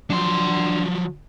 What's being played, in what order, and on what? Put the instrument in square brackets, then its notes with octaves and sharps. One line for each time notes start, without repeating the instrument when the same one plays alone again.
[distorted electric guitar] F3 F#3 [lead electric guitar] D4 C6